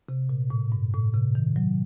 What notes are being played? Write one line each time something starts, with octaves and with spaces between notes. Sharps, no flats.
C3
A#2
A2
G2
A2
C3
D#3
F#3